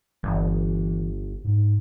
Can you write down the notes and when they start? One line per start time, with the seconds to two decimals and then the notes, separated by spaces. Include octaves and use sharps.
0.23 G1 E3
1.44 G#2